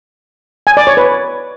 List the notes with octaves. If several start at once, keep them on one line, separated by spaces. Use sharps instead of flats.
G#5
D5
C#5
B4